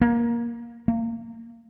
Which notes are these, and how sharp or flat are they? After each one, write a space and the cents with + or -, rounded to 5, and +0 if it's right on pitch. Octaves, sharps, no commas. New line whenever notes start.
A#3 +15
A#3 -25